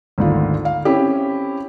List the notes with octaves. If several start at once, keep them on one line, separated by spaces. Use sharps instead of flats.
G#1 D2 F4
F5
C4 C#4 E4 G4